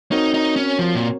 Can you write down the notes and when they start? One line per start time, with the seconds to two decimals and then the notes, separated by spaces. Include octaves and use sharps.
0.11 C4 D#4 F#4 A#4 C#5
0.34 D#4
0.56 C#4
0.79 F3
0.95 A#2